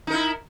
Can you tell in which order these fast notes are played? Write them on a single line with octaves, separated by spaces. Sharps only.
D#4 A#4 E4